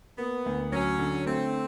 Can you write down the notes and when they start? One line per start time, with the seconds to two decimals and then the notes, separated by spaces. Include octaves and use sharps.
0.18 A#3 B3
0.46 D2
0.72 F#3 C#4
0.99 D3
1.26 A3 C4